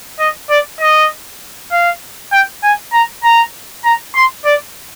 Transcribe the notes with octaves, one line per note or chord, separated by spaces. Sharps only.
D#5
D5
D#5
F5
G5
G#5
A#5
A#5
A#5
C6
D5